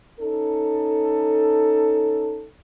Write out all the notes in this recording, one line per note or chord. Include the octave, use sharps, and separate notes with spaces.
C#4 D#4 A4